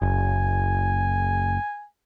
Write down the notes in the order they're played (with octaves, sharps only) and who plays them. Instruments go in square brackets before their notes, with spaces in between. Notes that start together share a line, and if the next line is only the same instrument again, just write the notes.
[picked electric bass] F#1 [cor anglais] G#5